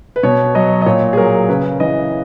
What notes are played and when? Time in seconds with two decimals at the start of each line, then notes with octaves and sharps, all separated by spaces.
0.16 B4
0.23 B2 C#5
0.55 F#3 D#5
0.82 D#5
0.86 A#2 C#5
1.13 G#4
1.17 F#3 A#4
1.49 C#3 B4
1.80 E3 D#5